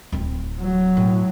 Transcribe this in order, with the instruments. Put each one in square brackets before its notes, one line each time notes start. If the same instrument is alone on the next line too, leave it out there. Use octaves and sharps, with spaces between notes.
[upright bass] D1 C4
[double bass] F#3
[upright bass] A2